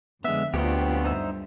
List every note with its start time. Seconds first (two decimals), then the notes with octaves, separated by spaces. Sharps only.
0.24 F2 D3 G#3 B3 E5
0.54 D2 F#3 B3 C4 F4 G4 C#5 G5
1.04 G2 D3 D#4 C5 E5